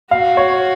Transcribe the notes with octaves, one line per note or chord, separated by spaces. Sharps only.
F#4 F5
C#5